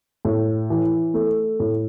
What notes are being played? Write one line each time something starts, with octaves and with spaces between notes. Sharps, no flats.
A2
E3
A3
A2